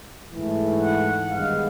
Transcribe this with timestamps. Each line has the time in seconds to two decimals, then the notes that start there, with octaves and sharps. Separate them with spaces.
0.30 G#2 E3 A3
0.81 F#5
1.31 G2 D#3 G#3 B3 F5